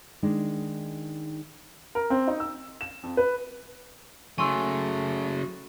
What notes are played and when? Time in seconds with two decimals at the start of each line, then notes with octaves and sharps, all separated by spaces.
0.23 D#3 G#3 D4 D#4
1.95 A#4
2.10 C4
2.27 D#4
2.40 E6
2.81 E7
3.03 F2
3.17 B4
4.38 C#3 F#3 A3 G#5 C6 C#6 E6